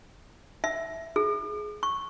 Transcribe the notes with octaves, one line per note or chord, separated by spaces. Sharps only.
E5
G#4
C#6